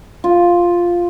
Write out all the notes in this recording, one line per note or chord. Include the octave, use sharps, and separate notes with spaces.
F4